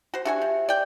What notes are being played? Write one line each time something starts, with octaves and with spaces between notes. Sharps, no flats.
F#4 C5
D4 F#4 G4 E5 G#5
F3
D5 G5